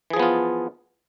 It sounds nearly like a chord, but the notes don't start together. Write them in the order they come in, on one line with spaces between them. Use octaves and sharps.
E3 G#4 F3 B3 F4